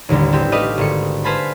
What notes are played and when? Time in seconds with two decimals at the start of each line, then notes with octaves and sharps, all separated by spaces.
0.09 A1 D#2 D3 G3
0.32 B3 C4 E4 G4
0.52 A3 B4 D5 D#5 F5
0.78 G#1 D3 C#7
1.24 B4 C5 F5 G#5 A5 B5